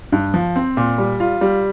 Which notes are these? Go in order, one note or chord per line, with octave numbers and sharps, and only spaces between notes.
G2
F3
C4
A#2
G3
F4
G3